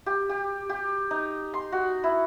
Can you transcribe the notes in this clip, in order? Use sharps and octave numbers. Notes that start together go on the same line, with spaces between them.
G4
G4
G4
D#4
C6
F#4
E4